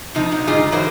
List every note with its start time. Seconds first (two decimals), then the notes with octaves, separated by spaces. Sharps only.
0.15 C3 F3 D#4
0.31 A#2 F#3 D#4
0.47 G#2 D3 D#3 D#4 F4 G#4
0.72 D3 E3 F#3 A#4 C5